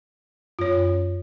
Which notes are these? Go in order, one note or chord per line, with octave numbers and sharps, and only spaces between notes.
F#2 F4 C#5